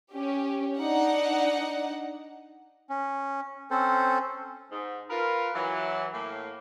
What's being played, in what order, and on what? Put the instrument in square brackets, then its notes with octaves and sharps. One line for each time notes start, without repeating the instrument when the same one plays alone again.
[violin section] C#4 G4
D4 D#4 F#5
[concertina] C#4
C4 C#4 A4 C5
[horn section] G#2
F4 A#4 B4
E3 F#3
A2 A#3